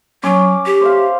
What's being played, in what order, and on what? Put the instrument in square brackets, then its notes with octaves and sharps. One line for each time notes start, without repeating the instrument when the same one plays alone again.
[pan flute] F#3 [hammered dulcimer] C#4 D6
[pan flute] G4
[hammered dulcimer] C5 E5 F5